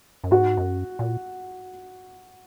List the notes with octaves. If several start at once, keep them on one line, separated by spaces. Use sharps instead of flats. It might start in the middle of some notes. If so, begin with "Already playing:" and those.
F#2
G#2 F#4
F#2
A#2